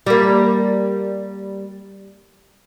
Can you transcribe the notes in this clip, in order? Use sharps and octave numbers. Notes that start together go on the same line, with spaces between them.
G3 A#3